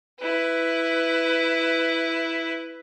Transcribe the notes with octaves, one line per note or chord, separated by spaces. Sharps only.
E4 B4